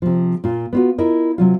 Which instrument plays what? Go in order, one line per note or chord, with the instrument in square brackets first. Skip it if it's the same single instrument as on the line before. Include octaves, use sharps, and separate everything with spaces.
[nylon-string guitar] C3 F3
A#2 F4
B3 F4 F#4
E4 F4 A#4 D#5
C3 F#3 F4